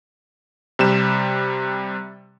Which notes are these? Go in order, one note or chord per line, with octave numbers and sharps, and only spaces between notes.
C3 G3 E7